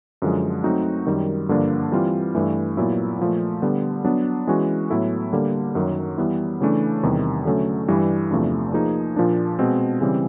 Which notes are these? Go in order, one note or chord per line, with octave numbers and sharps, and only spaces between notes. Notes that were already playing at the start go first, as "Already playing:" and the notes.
F#2 D3 F3 G#3
F#3 A3 C4 D#4 F#4
F#2 D#3 G3
G2 D3 F3 A#3 D4
E3 G3 C4 F4
G2 E3 A3
A#2 F#3 B3 E4
A#2 F3 A3
D3 G3 B3
F#3 B3 D4
E3 G#3 C#4 F#4
A2 F#3 B3 E4 A4
D3 G3 A#3
F#2 D#3 F#3
E3 G3 B3 E4
C#3 E3 A3 D4
E2 C3 D#3 G3
D3 F#3 A3 C#4
G2 E3 G3
E2 C3 F3 A3 D4
F3 A#3 D#4 G#4
A#2 F3 A#3 D4
B2 G#3 C4
C#3 E3 G3 C4